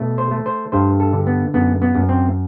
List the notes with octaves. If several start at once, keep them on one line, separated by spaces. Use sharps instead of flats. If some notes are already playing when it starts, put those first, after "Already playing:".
Already playing: B2 A3
C5
A3
C5
G2 C5
A4
D3
B3
F#2 B3
B3
F#2
C4